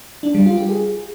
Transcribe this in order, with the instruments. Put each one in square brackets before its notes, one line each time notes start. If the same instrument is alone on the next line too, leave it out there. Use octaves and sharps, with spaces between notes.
[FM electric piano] D4
G3
F4
G4
G#4